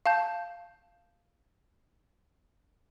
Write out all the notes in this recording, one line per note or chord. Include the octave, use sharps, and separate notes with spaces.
F5 A5 G6